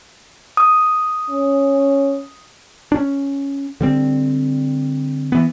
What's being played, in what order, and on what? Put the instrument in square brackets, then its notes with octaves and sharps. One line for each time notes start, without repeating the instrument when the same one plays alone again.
[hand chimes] D#6
[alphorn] C#4
[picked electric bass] C#4 D4
D3 G3 C4
E3 B3